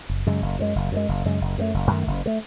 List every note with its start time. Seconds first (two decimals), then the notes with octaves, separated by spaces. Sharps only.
0.09 F#1
0.26 F#2 C#3 G#3
0.42 F#1
0.59 F#2 C#3 G#3
0.75 F#1
0.92 F#2 C#3 G#3
1.09 F#1
1.25 F#2 C#3 G#3
1.41 F#1
1.58 F#2 D#3 A3
1.74 F#1
1.91 F#2 D#3 A3
2.07 F#1
2.26 D#3 A3